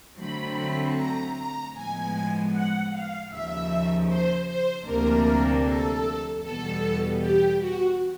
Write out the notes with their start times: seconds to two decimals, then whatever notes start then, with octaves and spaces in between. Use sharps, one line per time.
0.17 D3 F#3 A3 C4 B5
0.95 A#5
1.35 A#5
1.74 A2 F3 G#3 B3 G#5
2.52 F#5
2.91 F5
3.29 D#2 C#3 F3 E5
4.07 C5
4.47 C5
4.85 D2 C3 F3 A#3 D4 A#4
5.64 A4
6.41 E2 B2 G3 B3 A4
7.20 G4
7.58 F#4